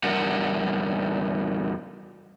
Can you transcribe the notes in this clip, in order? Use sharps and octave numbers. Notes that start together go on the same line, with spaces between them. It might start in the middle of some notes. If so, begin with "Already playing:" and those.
E2 G3 D4 A#4 F#5